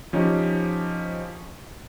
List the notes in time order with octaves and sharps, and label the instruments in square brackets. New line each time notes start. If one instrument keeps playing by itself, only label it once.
[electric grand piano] F3 C#4 D#4 G4